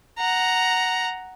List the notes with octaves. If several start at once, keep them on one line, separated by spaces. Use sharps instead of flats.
F#5 A#5